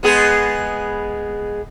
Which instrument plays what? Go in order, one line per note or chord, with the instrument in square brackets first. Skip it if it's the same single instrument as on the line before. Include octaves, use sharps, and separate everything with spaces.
[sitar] G#3 B3 G#4